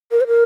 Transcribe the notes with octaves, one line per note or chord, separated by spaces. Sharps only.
A#4
C5
A#4